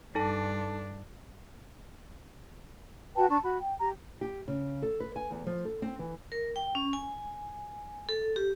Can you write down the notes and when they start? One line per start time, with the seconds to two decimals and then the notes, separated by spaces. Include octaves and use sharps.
0.15 G2 D4 D#4 A4 A5
3.16 F#4 B4 G5 A5
3.29 D4 A5 C#6
3.44 F#4 B5
3.59 G5
3.79 G4 A#5
4.21 G4
4.48 C#3
4.82 A4
5.00 B4
5.16 G#5
5.31 E2
5.47 F3
5.65 A4
5.82 C4
5.99 E3
6.32 A#4
6.56 G5
6.75 C#4
6.93 G#5
8.09 A4
8.36 G4